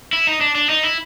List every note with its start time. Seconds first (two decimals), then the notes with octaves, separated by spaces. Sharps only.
0.13 E4
0.27 D#4
0.41 D4
0.55 D4
0.69 D#4
0.83 E4